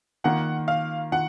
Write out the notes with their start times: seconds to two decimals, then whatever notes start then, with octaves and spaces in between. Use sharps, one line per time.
0.24 D#3 A#3 F4 F#5
0.68 F5
1.12 D#3 A#3 F4 F#5